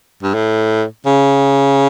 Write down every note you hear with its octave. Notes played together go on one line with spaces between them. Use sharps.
G2
A2
C#3